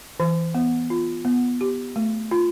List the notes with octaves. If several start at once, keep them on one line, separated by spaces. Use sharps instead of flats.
E3
B3
F4
B3
G4
A3
F4